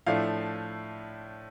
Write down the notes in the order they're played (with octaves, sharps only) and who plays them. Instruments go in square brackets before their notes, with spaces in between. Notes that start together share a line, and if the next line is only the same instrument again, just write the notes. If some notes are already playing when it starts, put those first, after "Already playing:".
[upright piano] A2 F3 A3 D4 F5